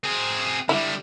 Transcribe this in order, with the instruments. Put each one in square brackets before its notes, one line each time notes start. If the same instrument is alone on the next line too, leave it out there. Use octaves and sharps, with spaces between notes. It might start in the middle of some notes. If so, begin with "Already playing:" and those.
[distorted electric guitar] C4 G#4
[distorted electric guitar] D3 G3 [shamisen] E4